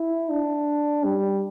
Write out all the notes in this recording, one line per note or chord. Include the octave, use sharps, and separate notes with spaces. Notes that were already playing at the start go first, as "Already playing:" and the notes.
Already playing: E4
D4
G3